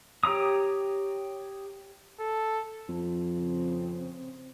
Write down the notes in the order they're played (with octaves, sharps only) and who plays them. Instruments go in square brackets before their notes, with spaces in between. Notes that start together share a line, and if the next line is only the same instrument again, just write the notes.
[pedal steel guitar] G4 C#5 A#5 D#6
[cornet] A4
[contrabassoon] F2
[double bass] C#3 C4